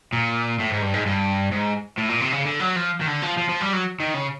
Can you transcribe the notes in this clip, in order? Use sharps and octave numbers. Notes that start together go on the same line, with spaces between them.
A#2
A2
G#2
G2
G#2
G2
G#2
A2
A#2
C3
C#3
D3
F#3
F3
D#3
D3
F3
F3
F3
G3
F#3
D#3
C#3